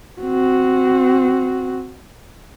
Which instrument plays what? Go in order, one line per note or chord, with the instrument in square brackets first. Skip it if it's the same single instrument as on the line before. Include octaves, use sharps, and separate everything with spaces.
[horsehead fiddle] C4 F#4